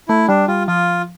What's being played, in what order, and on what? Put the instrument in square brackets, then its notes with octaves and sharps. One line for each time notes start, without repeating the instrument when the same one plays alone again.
[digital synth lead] A3 [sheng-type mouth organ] E4
[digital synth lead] G3 [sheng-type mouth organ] D4
[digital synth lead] G3 [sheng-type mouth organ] F4
[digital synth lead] F3 [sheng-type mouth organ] F4